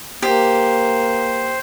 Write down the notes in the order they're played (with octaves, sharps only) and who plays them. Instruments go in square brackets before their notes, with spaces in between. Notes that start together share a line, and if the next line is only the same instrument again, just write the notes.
[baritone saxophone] A#3 [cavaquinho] G4 [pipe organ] C5